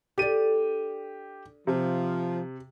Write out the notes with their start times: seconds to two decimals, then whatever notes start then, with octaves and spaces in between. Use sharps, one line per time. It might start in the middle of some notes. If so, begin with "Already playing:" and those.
0.18 D4 G4 A4 D#7
1.67 C3 F3